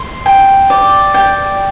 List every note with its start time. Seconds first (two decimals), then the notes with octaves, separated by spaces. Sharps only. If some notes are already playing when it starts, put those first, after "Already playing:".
Already playing: C6
0.26 G5
0.70 D5
1.14 G5